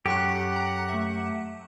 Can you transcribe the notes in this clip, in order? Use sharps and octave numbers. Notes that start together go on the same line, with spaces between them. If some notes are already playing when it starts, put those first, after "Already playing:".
F#2 G4 A4 F#5 C#6 F#6
A#5
A3 E5